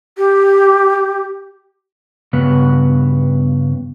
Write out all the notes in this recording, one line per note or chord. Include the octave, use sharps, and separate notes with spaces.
G4
G2 C#3 B3 B4